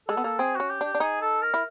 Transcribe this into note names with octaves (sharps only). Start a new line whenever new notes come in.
G#3 A4
B3
A#3 A4
C4 G#4
C#4 F#4
G4
D4 G4
D4
D#4 G#4
A4
A#4
E4